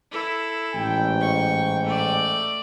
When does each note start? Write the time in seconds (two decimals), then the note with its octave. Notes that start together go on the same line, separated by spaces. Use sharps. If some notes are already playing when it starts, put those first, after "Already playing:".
0.11 E4 A4
0.74 A1 G#2 G5
1.21 C#6
1.84 A3 D5